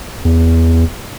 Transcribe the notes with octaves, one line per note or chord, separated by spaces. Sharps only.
E2